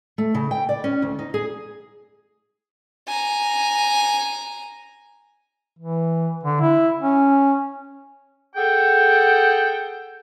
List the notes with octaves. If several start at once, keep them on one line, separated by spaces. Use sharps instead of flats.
A3
C#3
G5
D5
C#4
D2
D#4
G#4
G#5 A#5
E3
D3
E4
C#4
G#4 A4 F#5 G5